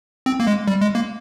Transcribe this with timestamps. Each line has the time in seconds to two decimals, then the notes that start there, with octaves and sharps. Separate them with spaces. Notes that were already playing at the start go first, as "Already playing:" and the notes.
0.26 C4
0.40 A#3
0.47 G#3
0.68 G3
0.81 G#3
0.95 A#3